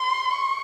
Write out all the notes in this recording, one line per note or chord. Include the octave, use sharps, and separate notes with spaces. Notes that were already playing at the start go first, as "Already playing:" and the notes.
Already playing: C6
C#6